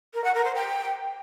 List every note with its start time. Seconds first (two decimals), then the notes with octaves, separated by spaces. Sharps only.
0.14 A#4
0.24 F#5
0.34 A#4
0.44 C5
0.55 G5